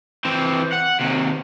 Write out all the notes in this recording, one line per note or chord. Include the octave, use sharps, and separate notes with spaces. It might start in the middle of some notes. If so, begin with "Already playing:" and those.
E3 C4
F#5
D#2 C3